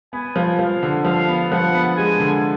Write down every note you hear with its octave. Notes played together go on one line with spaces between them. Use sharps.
B3 G#5
F3
F3 F5
D3
F3 F5
B3
F3 F#5
B3
G#3 G#5
D3